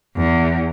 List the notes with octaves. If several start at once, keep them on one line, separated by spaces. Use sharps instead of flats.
E2